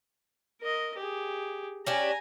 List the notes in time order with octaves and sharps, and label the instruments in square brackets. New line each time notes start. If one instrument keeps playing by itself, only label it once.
[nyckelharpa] A#4 D#5
G4 G#4
[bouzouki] C#4 D4 G4 [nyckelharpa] G#5 A#5